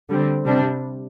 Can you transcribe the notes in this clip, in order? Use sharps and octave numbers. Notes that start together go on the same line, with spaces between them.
D3 G3 C4
C3 G3 D4